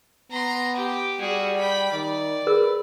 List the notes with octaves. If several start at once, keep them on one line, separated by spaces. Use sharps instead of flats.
B3 A#5 C6
G4
G3 F#4 G#4
G5 B5
D#3 D5
G#4 A#4 B4 E6